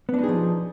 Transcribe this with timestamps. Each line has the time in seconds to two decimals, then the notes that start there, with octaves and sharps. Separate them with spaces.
0.09 B3
0.14 D4
0.19 D#4
0.24 G#4
0.28 F3